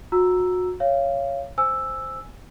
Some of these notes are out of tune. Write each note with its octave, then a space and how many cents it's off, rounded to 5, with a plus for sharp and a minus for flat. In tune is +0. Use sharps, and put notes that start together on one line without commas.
F#4 -30 A#5 +0 E6 +0
C#5 +0 F5 -20
C5 +0 G#5 +0 E6 +0